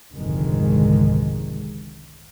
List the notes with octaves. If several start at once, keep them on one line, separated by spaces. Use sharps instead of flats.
F1 C2 G#2 D3 D#3 G#3